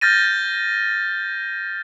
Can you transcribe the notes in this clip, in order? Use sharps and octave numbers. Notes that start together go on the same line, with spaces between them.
F6 G6 A6 A#6 D#7